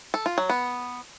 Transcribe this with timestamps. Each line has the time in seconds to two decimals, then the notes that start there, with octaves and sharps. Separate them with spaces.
0.14 A4
0.26 F4
0.38 F#3
0.50 B3